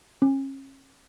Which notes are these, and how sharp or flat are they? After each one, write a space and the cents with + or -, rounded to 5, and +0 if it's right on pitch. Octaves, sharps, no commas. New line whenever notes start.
C#4 -35